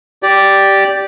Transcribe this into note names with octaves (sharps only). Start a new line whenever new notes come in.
G4 D5